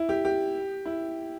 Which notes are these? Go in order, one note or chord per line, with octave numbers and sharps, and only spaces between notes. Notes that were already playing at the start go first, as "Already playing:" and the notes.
Already playing: E4
G4
G4
E4